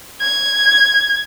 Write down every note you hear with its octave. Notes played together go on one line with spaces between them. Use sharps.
G#6